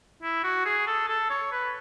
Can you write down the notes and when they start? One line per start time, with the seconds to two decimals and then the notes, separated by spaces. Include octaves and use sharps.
0.22 E4
0.43 F#4
0.65 G#4
0.87 A4
1.08 A4
1.30 C#5
1.52 B4